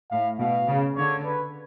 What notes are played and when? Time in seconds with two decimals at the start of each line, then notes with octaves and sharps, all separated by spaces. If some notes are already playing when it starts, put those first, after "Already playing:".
0.11 A2 F5
0.40 B2 F5
0.68 C#3
0.96 D3 C#5
1.25 B4